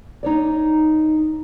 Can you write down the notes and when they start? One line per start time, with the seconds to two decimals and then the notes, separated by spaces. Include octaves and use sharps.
0.23 D#4 C#5 D5